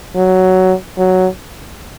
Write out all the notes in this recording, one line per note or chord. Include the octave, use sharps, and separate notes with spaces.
F#3
F#3